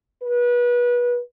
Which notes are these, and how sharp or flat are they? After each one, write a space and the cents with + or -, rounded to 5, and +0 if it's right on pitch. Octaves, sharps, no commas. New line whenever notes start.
B4 -30